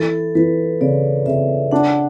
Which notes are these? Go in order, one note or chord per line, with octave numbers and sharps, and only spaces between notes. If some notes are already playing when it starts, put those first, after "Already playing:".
Already playing: E3 A4
E3 B4
C#3 D5
C#3 E5
D4 F#5